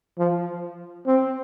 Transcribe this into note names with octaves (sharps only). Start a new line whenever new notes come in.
F3
C4